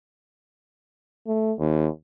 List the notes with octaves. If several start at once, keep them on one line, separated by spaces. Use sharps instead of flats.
A3
D#2